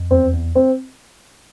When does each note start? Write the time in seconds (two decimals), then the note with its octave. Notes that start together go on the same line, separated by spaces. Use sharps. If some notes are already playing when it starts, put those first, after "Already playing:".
Already playing: F2
0.11 E2 C4
0.33 E2
0.55 C4